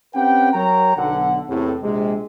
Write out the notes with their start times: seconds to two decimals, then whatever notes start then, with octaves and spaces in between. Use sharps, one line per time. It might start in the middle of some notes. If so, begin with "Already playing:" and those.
0.15 C4 C#4 G4 B4 F#5 G5
0.54 F#3 A#4 C#5 G5 A#5
0.97 B1 D3 F#5
1.49 E2 A2 C3
1.82 A#1 C3 G#3